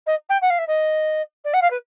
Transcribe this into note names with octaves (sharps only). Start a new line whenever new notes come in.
D#5
G5
F#5
F5
E5
D#5
D5
F#5
F5
B4